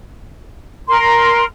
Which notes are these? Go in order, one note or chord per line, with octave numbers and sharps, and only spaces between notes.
A#4 C6